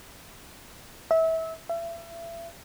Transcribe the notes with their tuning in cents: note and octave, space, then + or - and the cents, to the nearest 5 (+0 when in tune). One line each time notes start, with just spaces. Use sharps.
E5 -25
E5 +35